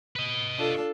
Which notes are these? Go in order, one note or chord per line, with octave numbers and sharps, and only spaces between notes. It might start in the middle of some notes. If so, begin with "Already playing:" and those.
B4 D#5
D4 F4 A4